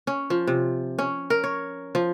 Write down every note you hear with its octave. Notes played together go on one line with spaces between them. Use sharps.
C#4
F3
C3
C#4
A#4
C#5
F3